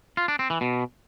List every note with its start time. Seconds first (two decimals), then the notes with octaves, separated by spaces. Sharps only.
0.17 F4
0.28 D4
0.39 C4
0.50 E3
0.61 B2